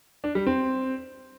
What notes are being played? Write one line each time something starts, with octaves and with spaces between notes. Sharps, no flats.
D4
G3
C4